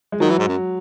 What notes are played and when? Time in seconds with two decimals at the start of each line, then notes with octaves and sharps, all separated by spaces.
0.12 G#3
0.20 D#3 F#3
0.30 E3
0.39 G#2
0.48 F#2